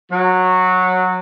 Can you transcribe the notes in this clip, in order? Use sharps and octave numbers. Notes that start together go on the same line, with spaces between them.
F#3